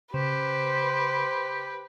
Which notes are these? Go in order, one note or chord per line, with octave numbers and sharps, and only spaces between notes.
C#3 G4 B4 C5